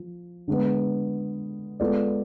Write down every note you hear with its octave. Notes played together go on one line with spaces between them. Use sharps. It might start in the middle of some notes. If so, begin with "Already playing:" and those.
Already playing: F3
D3 G#3 B3
G#3 B3 F4 A4 D5